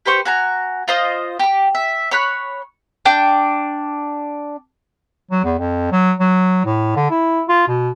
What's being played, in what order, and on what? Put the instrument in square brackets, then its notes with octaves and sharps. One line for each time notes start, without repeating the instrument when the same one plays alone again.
[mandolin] G4 B4 C5 C#6
F#4 G#5 A#5
F4 C5 D#5
G4 D6
E5
C#5 B5 F#6
D4 G5
[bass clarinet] F#3
E2
F2
F#3
F#3
A2
D3
E4
F4
B2